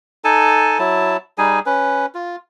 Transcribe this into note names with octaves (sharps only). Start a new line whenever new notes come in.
D#4 A4 G#5 A5
F#3 E4 A5
G3 D#4 G#4 G#5
C#4 B4
F4